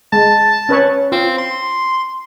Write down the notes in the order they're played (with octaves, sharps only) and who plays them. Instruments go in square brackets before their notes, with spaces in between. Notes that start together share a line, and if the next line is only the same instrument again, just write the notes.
[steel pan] G#3 [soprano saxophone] A5
[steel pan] C#4 B4 C#5
[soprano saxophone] C4 [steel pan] F4
[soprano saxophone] C6